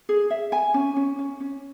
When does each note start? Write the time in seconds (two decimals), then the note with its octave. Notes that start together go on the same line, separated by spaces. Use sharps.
0.09 G#4
0.30 E5
0.52 G#5
0.74 C#4
0.96 C#4
1.19 C#4
1.40 C#4